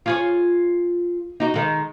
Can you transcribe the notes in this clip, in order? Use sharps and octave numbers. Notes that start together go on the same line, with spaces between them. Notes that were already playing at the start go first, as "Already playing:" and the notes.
F4 G#4 C#5
D#4 F#4
D#3 G#3